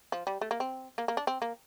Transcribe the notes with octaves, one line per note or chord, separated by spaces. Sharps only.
F3
G3
A3
A#3
C4
A#3
A#3
D4
C4
A#3